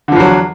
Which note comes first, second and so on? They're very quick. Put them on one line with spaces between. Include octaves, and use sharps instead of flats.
D3 F3 E2 F#3